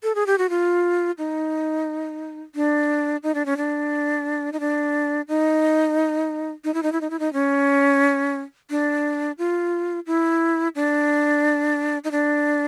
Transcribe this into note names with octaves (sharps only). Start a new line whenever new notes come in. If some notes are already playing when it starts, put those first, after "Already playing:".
A4
G#4
G4
F#4
F4
D#4
D4
D#4
D4
C#4
D4
D#4
D4
D#4
D#4
E4
D#4
E4
D#4
E4
D#4
C#4
D4
F4
E4
D4
D#4
D4